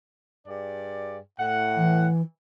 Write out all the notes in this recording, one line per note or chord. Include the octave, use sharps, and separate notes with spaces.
G2 G#4 D5
A2 F#5
E3